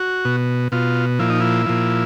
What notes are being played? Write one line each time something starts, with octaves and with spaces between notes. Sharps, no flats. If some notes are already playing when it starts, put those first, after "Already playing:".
Already playing: F#4
B2
B2 F4
A#2 F3 E4
D#4
E4
A#2 F3